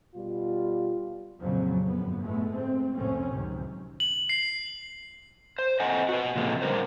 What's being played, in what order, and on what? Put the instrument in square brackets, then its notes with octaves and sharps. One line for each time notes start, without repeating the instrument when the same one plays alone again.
[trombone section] B2 G3 F4
[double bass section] F2 A#2 C#3 F3 F#3
G1 F#2 B3
A2 G#3 A3 B3
C4
C2 F2 A2 C4 C#4
C#2 F#2 C3 D#3
[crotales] F#7
C7
[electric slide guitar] C5
C4 A4 D#5 F#5 G#5
F#4 B4
A#2 C#3 F3 G#3 C4 A4
D3 G3 G#3 F4 A#4 C5